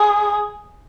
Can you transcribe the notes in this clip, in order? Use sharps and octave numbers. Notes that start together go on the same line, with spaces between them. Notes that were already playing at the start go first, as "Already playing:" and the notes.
Already playing: G#4